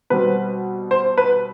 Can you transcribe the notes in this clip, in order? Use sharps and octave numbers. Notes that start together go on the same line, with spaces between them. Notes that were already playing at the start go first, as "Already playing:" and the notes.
B2 G3 C4 B4
C5
B4